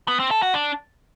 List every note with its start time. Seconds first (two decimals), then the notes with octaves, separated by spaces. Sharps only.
0.08 B3
0.19 C4
0.31 A4
0.42 F#4
0.54 D4